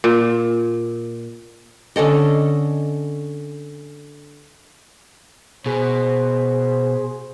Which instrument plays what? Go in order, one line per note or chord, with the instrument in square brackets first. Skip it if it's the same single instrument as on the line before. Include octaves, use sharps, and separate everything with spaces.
[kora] A#2
[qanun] D3 C#4 A4 D#5
[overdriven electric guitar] B2 [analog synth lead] G#4 [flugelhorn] C5